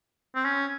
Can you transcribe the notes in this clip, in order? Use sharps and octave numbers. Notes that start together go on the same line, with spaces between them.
C4
C#4